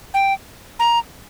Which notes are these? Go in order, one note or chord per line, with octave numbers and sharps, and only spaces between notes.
G5
A#5